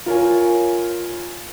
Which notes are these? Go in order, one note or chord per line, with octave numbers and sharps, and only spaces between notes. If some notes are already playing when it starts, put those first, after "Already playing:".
F4 A#4 C#5 G#5